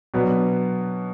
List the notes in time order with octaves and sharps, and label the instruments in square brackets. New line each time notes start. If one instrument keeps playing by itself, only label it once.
[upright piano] B2 F#3 B3 D4